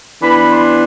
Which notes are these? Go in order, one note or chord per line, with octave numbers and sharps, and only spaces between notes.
E3 B3 D4 B5
C6